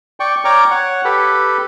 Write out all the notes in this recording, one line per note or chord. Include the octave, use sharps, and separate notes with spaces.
D5 G5 C#6
C#5 D5 G5 A#5 D6 F6
C#5 F#5
G4 A4 B4